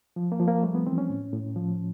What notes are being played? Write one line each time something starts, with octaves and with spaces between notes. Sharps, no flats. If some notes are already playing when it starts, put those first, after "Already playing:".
F3
A#3
F3
A#3
G3 A3
B3
E3 C4
C#4
A2
A2
F3